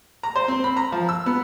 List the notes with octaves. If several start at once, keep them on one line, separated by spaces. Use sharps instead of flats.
A#5
C5
C4
B5
A#5
F3
E6
B3